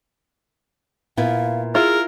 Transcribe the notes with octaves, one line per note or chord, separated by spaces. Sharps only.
A#2 B3 E4 F5
E4 F4 G#4 A#4